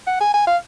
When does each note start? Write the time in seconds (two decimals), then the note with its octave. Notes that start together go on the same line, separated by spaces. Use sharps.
0.07 F#5
0.21 G#5
0.34 G#5
0.47 F5